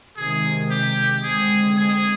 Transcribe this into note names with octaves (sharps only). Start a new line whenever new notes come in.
C3 D#3 G#3 G#4
G4
D3 G#3 C4 G#4
G#4